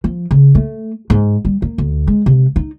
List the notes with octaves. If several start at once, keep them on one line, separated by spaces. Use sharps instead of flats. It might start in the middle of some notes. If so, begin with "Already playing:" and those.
F3
C#3
A3
G#2
G3
A#3
D2
G#3
C3
D#4